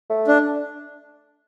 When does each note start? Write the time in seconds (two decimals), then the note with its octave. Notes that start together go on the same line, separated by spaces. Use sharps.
0.10 A3
0.28 D4